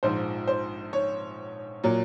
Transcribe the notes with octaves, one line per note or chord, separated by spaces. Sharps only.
A#1 G#2 F3 C5
C5
C#5
A#2 F#3